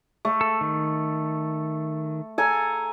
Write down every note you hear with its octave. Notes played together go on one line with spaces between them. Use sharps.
A3
A4
D#3
A4 G#5 A#5